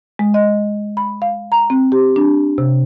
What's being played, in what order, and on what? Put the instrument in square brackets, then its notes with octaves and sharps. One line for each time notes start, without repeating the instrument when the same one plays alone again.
[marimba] G#3
D#5
B5
F5
A#5
C4
G4
D4
C3